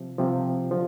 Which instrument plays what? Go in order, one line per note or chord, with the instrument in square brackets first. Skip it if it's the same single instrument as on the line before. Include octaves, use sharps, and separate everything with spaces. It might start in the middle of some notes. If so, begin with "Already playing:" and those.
Already playing: [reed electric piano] C3 F3
C2 C3 F3
D3 F3